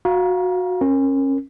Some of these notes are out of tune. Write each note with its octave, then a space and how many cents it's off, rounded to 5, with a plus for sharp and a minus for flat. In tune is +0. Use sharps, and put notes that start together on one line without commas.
F#4 -15 F5 +0 A#5 +30
C#4 -30 A#4 +0